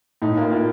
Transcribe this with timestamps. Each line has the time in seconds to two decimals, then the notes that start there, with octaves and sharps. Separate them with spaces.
0.22 A2 D#4
0.37 A#3 F4
0.51 A#3